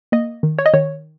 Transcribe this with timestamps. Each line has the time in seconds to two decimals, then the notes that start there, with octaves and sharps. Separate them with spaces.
0.12 A#3 D#5
0.43 D#3
0.59 C#5
0.66 D#5
0.74 D#3 C#5